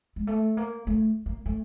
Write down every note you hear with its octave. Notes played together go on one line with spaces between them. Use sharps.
G#3
A3
A#3
A3
A#3
A3